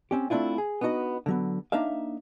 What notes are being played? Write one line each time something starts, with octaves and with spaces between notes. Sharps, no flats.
C4 C#4 G4
A3 C4 D4 E4 F4
G#4
B3 D4 D#4 F#4 D#5
D3 F#3 B3
A#3 D4 D#4 E5 F5